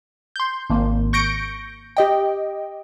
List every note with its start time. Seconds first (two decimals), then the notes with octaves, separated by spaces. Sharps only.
0.36 C6 G6
0.70 G#1 A#3
1.13 C#6 G6 A#6 C#7 D7
1.97 G4 D#5 G5